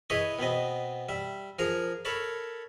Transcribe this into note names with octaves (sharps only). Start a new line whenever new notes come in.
E4 G#4 B4 C#5 D#5
B2 B3 C4 D#5
G3 E5
F3 G#4 A#4 A#5
A4 A#4 C#5 A5 B5